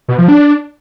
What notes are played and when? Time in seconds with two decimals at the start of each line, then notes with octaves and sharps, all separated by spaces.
0.08 B2
0.18 F3
0.28 D4